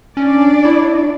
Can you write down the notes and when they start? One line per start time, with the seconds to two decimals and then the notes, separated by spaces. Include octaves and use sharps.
0.17 C#4 D4 D5
0.65 E4